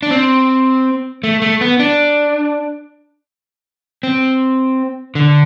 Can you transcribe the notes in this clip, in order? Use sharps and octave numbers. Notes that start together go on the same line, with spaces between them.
D4
C4
A3
A3
B3
D4
C4
D3